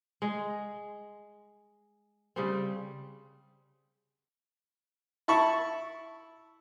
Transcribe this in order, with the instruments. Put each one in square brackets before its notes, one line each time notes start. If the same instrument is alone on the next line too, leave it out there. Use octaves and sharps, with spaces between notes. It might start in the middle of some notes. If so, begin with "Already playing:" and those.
[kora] G#3
C#3 G3 C4
[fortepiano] E4 A5 B5 C#6